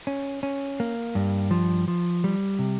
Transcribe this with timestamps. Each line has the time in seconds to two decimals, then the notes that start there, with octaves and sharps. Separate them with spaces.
0.07 C#4
0.43 C#4
0.80 A#3
1.15 G2
1.51 F3
1.88 F3
2.24 G3
2.59 C3